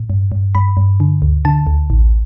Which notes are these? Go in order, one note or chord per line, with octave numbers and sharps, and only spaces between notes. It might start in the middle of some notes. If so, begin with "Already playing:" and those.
Already playing: A2
G2
G2
G2 B5
G2
D3
D2
D3 A5
D2
A1